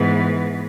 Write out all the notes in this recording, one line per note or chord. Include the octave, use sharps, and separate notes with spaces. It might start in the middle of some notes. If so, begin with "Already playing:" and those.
Already playing: G#2 E3 B3